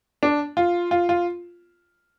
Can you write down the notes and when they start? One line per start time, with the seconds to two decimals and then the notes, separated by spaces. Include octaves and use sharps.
0.23 D4
0.57 F4
0.91 F4
1.09 F4